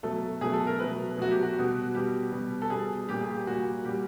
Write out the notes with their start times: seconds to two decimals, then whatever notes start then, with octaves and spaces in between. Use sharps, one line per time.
0.03 B2 F#3 A3 A4
0.41 B2 F#3 A3 G#4
0.53 A4
0.67 A#4
0.79 B2 F#3 A3 B4
1.17 B2 F#3 A3 F#4
1.31 G4
1.43 F#4
1.56 B2 G3
1.94 B2 G3 G4
2.32 B2 G3
2.62 A4
2.70 B2 G3 G#4
3.09 A#2 G3 G4
3.21 G#4
3.34 G4
3.47 A#2 G3 F#4
3.85 A#2 G3 G4